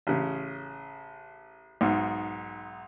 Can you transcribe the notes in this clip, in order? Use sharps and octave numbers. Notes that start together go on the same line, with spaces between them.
A1 C#3
B1 G#2